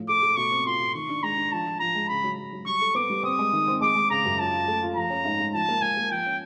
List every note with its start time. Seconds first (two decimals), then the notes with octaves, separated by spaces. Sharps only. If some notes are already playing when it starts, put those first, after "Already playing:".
Already playing: A2 F3
0.09 A3 D6
0.23 A3
0.36 B2 C#6
0.51 C4
0.65 F4 C6
0.80 B2
0.95 D#3 C#6
1.09 D4
1.23 G#3 A#5
1.38 D4
1.52 F3 A5
1.67 F3
1.80 F3 A#5
1.95 G#3
2.09 C#3 B5
2.24 F#3
2.38 F#3
2.53 F#3
2.66 G3 C#6
2.81 A4
2.95 B3 D6
3.10 G3
3.24 C4 D#6
3.39 G#3
3.53 D#3
3.68 C4
3.81 G#3 D6
3.95 G#3
4.10 C#3 A#5
4.25 F#2
4.39 F4 A5
4.53 F4
4.68 A3
4.82 F4
4.96 F3 A#5
5.10 C#4
5.25 G#2
5.39 G#2
5.54 F3 A5
5.69 A#3
5.82 A#3 G#5
5.97 A#3
6.11 F3 G5
6.26 C#4